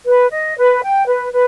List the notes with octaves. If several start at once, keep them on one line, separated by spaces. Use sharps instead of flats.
B4
D#5
B4
G5
B4
B4